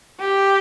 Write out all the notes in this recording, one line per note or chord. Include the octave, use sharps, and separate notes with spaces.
G4